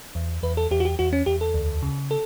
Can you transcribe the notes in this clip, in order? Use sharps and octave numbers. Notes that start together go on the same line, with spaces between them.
E2
E2 B4
A4
E2 G4
F#4
G4
E2 F#4
C#4
E2 G4
A4
D2
C#3
A4